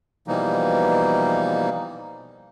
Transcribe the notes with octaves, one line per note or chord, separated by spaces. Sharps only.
B2 E3 F3 G3 A#3 D#4